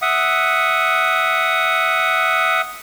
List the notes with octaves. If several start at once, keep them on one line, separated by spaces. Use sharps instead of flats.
E5 F#5 D#6